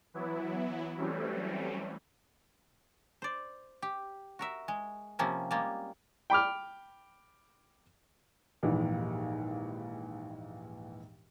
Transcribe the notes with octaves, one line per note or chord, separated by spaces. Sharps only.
E3 F#3 B3 E4
E3 F#3 G3 A3 C4 C#4
C5 D5
G4
F#4 A#4 E5
G#3
C3 F3 A#3 C4 C#4
G3 G#3 A#3 F4
G5 B5 D6 F6
A#1 D#2 G#2 E3